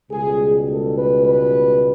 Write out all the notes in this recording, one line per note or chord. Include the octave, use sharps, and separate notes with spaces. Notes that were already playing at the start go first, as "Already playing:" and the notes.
C#2 B2 G3 G#4
A4
B4
B4